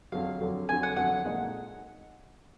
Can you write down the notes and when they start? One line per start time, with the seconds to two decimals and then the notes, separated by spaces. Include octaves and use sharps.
0.12 F2 D3 F#3 F5
0.41 F2 D3 F#3
0.68 F2 D3 F#3 G#5
0.83 F#5
0.96 F2 D3 F#3 F#5
1.25 A#2 G#3 D#4 G#4